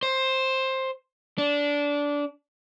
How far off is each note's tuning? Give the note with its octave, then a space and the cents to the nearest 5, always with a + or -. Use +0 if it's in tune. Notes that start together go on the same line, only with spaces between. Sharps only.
C5 +10
D4 -20